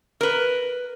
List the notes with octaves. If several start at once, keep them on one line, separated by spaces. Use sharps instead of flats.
A#4 B4